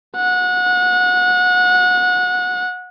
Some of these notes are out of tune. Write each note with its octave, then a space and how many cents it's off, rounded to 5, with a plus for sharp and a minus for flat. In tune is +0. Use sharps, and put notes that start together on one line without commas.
F#5 -30